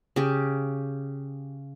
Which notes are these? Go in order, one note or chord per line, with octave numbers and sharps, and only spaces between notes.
C#3 G4